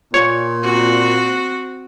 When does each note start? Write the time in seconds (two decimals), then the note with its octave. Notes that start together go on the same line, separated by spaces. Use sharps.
0.14 A#2 C#5
0.63 C4 F#4